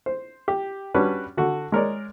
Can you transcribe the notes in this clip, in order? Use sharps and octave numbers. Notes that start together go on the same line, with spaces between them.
C5
G4
G3 C#4 D4 F#4 B4
D3 F#4
G#3 A#4 C#5 D5